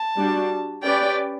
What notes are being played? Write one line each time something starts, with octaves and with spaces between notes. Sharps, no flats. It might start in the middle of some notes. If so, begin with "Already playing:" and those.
Already playing: A5
G3 D4 F#4
C#4 G4 B4 D5 G5